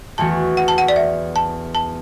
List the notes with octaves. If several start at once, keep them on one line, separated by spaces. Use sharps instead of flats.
E2 E3 A3 F#4 A5
F#5
A5
F#5
D5
E5
A5
A5